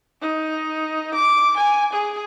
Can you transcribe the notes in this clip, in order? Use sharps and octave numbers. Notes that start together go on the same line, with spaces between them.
D#4
D6
G#5
G#4